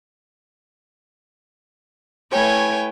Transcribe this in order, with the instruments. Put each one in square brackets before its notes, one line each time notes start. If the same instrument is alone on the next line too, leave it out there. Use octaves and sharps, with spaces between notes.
[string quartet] A3 E4 B4 C#5 G5 G#5